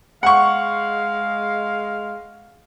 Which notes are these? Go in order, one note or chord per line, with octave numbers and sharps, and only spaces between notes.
G#3 F5 F#5 C#6